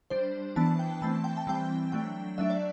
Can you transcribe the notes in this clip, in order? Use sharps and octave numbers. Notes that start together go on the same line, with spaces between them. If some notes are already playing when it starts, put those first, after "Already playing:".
G3 D4 C5
E3 B3 D4 A5
G5
E3 A3 C4 A5
G5
A5
E3 G3 C4 G5
F#3 A3 D4 G5
F#3 A3 D4 E5
D5